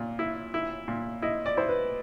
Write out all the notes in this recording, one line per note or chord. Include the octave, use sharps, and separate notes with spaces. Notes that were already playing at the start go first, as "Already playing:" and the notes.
Already playing: A#2
E4
E4
A#2
E4 D#5
D5
E4 C5
B4